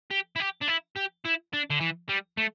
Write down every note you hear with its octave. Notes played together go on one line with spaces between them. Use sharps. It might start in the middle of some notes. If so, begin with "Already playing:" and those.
G4
E4
G4
D4
E4
G4
E4
D4
D3
E3
G3
A3